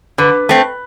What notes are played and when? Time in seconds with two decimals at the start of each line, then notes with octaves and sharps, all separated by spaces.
0.18 D3 B4
0.49 A3 C4